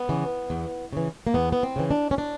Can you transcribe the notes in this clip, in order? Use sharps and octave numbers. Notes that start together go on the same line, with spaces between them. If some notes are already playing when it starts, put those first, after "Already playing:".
Already playing: B3
C#3 E3
E2
C#3 E3
A#3
E2 B3
B3
C4
C#3 E3
D4
C#4
D4